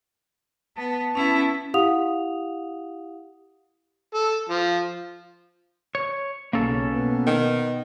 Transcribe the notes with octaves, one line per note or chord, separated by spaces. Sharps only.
B3 A5
B3 C#4 E4
E4 G4 F5 F#5 D#6 F7
A4
F3
C#5
B1 C#3 A#3 C#4 A4
B2 B3
D#3